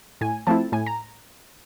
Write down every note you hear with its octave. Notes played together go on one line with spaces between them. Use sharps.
A2 G#5
F3 A3 C4 E4 A5
A2 G#5
A#5